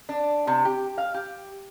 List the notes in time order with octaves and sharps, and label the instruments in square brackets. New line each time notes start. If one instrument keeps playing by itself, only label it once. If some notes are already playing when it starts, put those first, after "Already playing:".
[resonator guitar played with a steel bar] D4
C3
G4
F5
G4